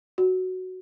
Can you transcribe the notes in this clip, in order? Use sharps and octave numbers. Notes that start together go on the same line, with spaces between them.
F#4